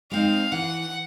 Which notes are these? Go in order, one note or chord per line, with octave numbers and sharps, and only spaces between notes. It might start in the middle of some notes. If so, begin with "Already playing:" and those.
G#3 C4 D#4 F5
E3 F#5